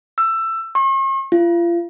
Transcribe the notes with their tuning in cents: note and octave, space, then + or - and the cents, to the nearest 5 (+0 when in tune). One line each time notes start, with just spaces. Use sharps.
E6 +15
C#6 -45
F4 -35